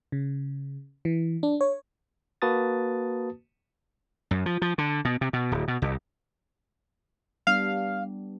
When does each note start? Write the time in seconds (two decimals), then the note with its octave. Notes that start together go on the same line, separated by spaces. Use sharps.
0.12 C#3
1.05 E3
1.43 D4
1.61 C#5
2.42 A#3 F#4 B4 A5 D#6 A6
4.31 F#2
4.46 F3
4.62 F3
4.78 D3
5.05 B2
5.21 C3
5.33 B2
5.52 D1
5.68 B2
5.82 C2
7.47 G3 B3 D4 F5